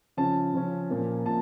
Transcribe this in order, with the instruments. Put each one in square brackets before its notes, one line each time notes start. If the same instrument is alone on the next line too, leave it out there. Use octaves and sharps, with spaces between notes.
[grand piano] C#3 F3 C#4 A5
C#3 F3 C#4
A#2 F3 A#3 C#4
A#2 A5